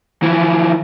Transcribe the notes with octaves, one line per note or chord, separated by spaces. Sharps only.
E3 F3